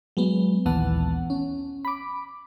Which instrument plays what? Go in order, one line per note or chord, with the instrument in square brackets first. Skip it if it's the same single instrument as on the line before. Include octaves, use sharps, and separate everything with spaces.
[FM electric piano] F#3 G#3 B3
A#1 D#2 E3 B3 F#5 A5
C#4
B5 D6